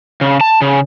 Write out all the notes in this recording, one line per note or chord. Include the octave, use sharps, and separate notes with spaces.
C#3
A5
C#3